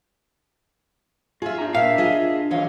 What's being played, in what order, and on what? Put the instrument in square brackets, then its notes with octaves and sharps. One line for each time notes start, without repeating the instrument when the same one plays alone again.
[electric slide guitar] F4 F5 [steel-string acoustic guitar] G#4 E5
[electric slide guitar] D4 A#5
[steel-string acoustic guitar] A#2 [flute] E5 [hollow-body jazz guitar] F5
[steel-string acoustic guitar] F4 G#4 D#5
[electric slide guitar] D3 E3 F#3 [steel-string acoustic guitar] C#5 D#5 F5